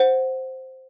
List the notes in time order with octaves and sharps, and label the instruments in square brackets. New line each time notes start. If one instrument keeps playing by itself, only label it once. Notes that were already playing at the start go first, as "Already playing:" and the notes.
Already playing: [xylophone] C5 F#5